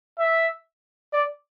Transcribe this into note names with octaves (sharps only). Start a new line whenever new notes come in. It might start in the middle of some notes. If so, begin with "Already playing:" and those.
E5
D5